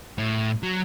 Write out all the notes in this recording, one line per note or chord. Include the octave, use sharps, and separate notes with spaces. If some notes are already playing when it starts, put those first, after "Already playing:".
A2
F#3